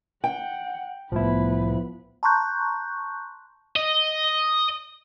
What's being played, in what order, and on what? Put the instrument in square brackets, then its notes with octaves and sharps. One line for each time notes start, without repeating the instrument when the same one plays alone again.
[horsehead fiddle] F#5 [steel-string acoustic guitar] G5
[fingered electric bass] C2 A2 A3 [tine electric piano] F3 E4 [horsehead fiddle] B3 B4
[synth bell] A5 A#5 C6 C#6 F#6 G6
[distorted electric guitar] D#5